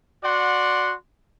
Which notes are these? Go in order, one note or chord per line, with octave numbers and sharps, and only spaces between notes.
F#4 D5 F#5 C6